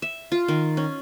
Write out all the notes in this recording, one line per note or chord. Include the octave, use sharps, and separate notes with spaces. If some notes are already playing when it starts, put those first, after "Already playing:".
E5
F4
D#3
C#4